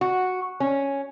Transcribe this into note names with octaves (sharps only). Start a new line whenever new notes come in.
F#4
C#4